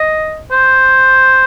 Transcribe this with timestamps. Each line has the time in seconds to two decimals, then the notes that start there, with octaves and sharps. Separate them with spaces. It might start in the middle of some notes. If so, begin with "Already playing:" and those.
Already playing: D#5
0.51 C5